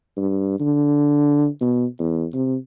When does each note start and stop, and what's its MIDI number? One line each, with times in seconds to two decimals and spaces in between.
0.17 0.57 43
0.60 1.47 50
1.61 1.85 47
1.99 2.26 40
2.33 2.55 48